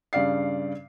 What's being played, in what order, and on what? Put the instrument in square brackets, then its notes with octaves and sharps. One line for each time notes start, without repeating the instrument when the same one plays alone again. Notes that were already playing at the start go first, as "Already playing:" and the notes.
[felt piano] G2 C#3 D5 F5 C7